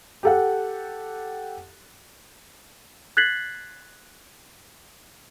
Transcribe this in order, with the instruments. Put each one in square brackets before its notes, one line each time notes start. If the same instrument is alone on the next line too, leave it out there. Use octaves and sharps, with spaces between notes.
[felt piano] G4 A4 F#5
[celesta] F#6 G#6 A6 B6 C7 F#7